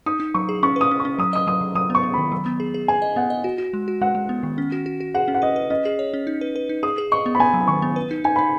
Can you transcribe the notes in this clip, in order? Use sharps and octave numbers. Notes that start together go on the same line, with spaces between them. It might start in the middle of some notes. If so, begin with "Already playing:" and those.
D#4 D#6
D#4
F#3 C#6
G#4
C#4 C#6
B4 D#6
C#4
C#6
C#4
F#3 D#6
D#5 D#6
F#3 D#6
F#3
F#3 D#6
B3
C#6
B3
D#3 B5
F#3
B3
G#4
G#4
G#4 G#5
D#5
B3 F#5
D#5
F#4
F#4
G#3
F#4
G#3 F#5
G#3
B3
D#3
C#4
F#4
F#4
F#4
G#4 F#5
C#4
F#5
B4 D#5
B4
C#4 D#5
G#4
C#5
C#4
D#4
B4
B4
D#4
G#4 D#6
G#4
D#5 C#6
B3
B5
B3 G#5
F#3
B5
D#3 C#6
B3
B4
D#4
D#4 G#5
D#4 B5